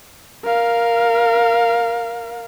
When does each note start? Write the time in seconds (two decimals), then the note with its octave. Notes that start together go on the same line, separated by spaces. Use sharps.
0.44 A#4 F5